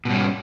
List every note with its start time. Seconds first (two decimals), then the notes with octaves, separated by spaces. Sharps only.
0.05 B2
0.08 G#2
0.10 G3
0.13 C#4